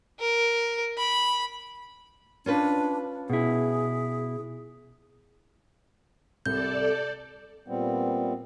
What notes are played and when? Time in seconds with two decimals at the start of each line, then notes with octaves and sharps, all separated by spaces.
0.20 A#4
0.97 B5
2.46 C#4 D4 F4 B4
3.30 B2 E4 G#4
6.46 C2 A4 D5 G6
7.68 A#2 G3 B3 C4